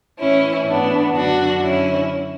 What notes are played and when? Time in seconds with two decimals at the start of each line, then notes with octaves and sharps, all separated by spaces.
0.20 A2 E3 C#4 E4
0.68 B3 D4
1.15 F#2 D3 D4 F#4
1.63 C#4 E4